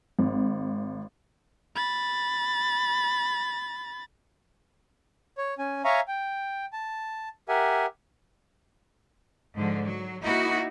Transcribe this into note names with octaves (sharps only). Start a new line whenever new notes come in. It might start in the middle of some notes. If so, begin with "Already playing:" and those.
G#1
B5 A6
C#5
C#4 G#5
C#5 E5 F5 G#5 A#5 C#6
G5
A5
G4 A#4 E5 F#5 G#5
G#2 D3 F3
F#3
A#3 D#4 E4 F#4